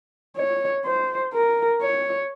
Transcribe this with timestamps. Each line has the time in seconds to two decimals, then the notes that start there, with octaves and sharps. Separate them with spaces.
0.36 C#5
0.85 C5
1.33 A#4
1.81 C#5